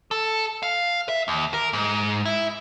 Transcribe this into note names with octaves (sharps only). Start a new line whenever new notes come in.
A4
F5
E5
D#2
A#4
G#2
E4